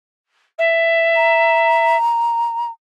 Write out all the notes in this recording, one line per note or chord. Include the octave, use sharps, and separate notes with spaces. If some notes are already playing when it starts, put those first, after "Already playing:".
E5
A#5